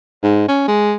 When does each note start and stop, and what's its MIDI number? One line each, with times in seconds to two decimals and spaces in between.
0.23 0.45 44
0.48 0.65 61
0.68 0.95 56